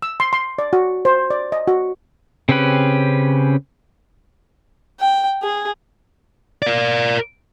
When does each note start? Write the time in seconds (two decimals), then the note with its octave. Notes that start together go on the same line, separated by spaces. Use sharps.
0.02 E6
0.20 C6
0.33 C6
0.59 D5
0.73 F#4
1.05 C5
1.30 D5
1.52 D#5
1.68 F#4
2.49 C#3 C4 C#4 G4 B4
5.00 G5
5.43 G#4
6.62 A#4 D5